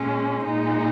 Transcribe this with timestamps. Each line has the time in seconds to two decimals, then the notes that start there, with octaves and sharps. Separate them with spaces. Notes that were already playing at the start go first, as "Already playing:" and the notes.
Already playing: A#2 G#3 C#4
0.45 A#2 G#3 D#4